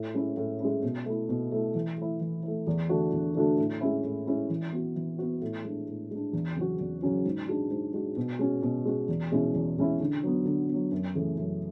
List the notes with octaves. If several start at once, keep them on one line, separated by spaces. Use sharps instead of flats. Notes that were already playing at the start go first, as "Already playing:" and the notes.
Already playing: A2
G#3 C#4 E4
A2
G#3 C#4 E4
B2
A3 E4
B2
A3 E4
E3
A3 E4
E3
A3 E4
E2
D3 A3 D4 F#4
E2
D3 A3 D4 F#4
A2
G#3 C#4 E4
A2
G#3 C#4 E4
E3
B3 F#4
E3
B3 F#4
A2
G#3 D4
A2
G#3 D4
E2
C#3 F#3 C#4 F#4
E2
C#3 F#3 C#4 F#4
G#2
G#3 D4 F#4
G#2
G#3 D4 F#4
B2
G#3 C#4 F#4
B2
G#3 C#4 F#4
E2
B2 G#3 C#4 E4
E2
B2 G#3 C#4 E4
D3
F#3 B3
D3
F#3 B3
F#2
C#3 E3 A3
F#2